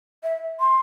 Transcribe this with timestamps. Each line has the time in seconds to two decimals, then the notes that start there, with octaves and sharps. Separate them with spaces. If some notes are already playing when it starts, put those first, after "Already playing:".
0.23 E5
0.60 C6